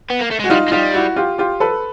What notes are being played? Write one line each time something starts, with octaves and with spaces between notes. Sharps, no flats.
B3
A#3
A3
G#3 F#4
G3 D#4 F4
G#3
G3 D#4 F4
E4 F#4
F4 G4
F4 G4
A4 B4